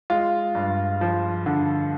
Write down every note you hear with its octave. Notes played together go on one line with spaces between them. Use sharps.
G#3 F4
G2
F3
D3